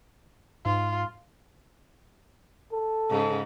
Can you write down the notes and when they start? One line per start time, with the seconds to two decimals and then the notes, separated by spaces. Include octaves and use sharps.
0.66 G#2 F4
2.72 A4
3.10 G#2 C#3